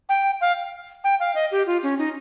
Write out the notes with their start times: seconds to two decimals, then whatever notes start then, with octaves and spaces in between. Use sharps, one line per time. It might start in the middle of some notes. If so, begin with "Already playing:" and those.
0.09 G5
0.41 F5
1.04 G5
1.20 F5
1.35 D#5
1.52 G4
1.66 F4
1.83 C#4
1.99 D#4